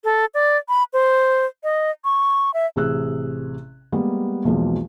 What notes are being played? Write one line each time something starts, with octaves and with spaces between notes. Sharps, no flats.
A4
D5
B5
C5
D#5
C#6
E5
A1 C3 G#4 E6 F#6
G3 G#3 A#3 B3
B1 E2 F3 F#3 G#3 A#3